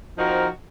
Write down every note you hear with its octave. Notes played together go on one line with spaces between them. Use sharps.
F3 C4 D#4 F#4 A#4